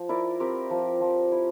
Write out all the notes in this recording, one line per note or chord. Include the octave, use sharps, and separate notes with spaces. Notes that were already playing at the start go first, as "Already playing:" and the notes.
Already playing: F3
E4 A#4 D5
C4 G4 A#4
F3
F3
E4